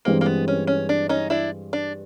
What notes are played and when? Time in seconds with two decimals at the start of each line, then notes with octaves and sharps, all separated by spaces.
0.05 G2 E3 G#3 A#3 C4
0.21 A#3
0.26 B3
0.48 C#4
0.67 C#4
0.89 D4
1.09 C#4 D#4
1.30 D4 E4
1.73 D4